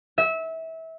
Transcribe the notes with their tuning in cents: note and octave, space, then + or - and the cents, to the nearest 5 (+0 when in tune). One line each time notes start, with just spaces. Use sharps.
E5 -25